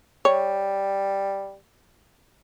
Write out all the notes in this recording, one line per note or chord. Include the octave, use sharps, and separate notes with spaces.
G3 C#5